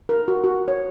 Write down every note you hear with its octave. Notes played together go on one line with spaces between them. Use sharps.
A#4
F#4
F#4
C#5